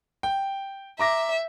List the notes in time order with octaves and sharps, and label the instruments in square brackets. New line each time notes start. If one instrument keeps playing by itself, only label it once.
[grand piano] G5
[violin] E5 [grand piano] A#5 D6 A#6